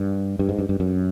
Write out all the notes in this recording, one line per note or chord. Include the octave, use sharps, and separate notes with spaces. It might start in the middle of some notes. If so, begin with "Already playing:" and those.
Already playing: G2
G2
G#2
G2
G2
F#2